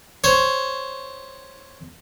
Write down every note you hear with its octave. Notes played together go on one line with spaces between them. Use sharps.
C5 C#5